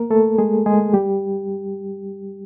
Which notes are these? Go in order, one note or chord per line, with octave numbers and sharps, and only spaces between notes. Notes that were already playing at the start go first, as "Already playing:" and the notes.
Already playing: A#3 A#4
A3 A4
G#3 G#4
G#3 G#4
G3 G4